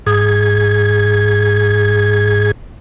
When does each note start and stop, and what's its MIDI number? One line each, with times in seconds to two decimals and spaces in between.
0.07 2.51 44
0.07 2.51 68
0.07 2.51 92